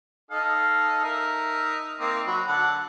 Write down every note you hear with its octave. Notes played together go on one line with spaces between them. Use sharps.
D#4 A4 F5
D#4 A#4 E5
A#3 C4 D#4
F#3 B5
D3 F#5 A5